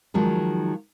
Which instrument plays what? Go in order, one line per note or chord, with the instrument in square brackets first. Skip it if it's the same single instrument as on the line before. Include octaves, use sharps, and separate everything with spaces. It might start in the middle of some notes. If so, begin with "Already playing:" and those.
[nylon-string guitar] D#3 F3 F#3 G#3